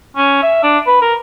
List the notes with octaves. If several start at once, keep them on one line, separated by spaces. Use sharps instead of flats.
C#4
E5
D4
B4
A#4